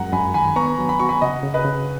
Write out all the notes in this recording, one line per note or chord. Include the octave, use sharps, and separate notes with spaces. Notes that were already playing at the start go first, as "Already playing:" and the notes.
Already playing: F#2 G#3 F#5 A#5
F#2 G#5 B5
D#3 G#5 B5
B3 A#5 C#6
F#3
B5
F#4 C#6
G#5 B5
C#3 D#5 F#5
C#3
B4 D#5
C#3